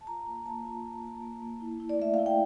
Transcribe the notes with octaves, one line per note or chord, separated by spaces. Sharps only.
A5
F4 A#5
A#3
A#3 A5
F4
F4
A#3
A#3
A#3
E4
E4
D5
A3 E5
F5
E4
G5